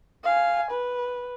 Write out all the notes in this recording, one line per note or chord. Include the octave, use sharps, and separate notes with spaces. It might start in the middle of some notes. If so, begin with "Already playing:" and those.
F5 G#5
B4